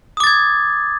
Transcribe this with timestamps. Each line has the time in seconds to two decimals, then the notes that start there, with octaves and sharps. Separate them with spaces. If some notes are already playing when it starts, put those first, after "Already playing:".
0.17 D#6
0.20 D6
0.24 A6
0.27 G#6